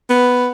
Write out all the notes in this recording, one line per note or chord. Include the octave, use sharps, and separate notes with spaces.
B3